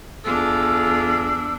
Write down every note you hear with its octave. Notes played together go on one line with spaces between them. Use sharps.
E2 D4 F4 G#4 A4 E6